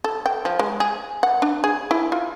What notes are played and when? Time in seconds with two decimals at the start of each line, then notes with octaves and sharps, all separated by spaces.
0.04 A4
0.26 G5
0.45 F3
0.59 G#3
0.80 G#4
1.23 F#5
1.42 D4
1.64 G#4
1.91 E4
2.12 F4